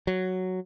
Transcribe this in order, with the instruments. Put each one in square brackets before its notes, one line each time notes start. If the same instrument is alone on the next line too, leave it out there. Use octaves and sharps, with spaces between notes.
[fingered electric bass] F#3